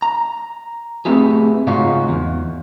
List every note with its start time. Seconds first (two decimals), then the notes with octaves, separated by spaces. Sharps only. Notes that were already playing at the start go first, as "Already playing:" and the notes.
0.02 A#5
1.05 A3 B3 C4 E4 G4 G#4
1.67 G#2 C#3 C#4 D#4 F4 F#4
2.09 E2